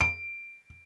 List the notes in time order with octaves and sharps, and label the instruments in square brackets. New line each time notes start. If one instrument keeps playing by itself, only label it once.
[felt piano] D7